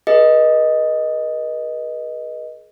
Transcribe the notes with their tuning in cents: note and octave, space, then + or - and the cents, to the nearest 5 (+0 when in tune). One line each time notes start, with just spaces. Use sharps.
G#4 +30 B4 -40 D#5 +0